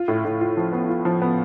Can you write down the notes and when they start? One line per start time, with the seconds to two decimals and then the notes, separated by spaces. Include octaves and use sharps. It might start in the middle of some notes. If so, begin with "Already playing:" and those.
Already playing: F4
0.08 A2
0.25 A2
0.41 F4
0.57 F3
0.72 B3
0.89 F4
1.05 F3
1.22 B3